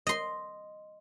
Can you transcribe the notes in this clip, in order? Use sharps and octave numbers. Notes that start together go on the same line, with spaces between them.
D#5 C6